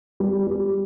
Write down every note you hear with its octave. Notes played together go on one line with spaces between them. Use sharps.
G3
G3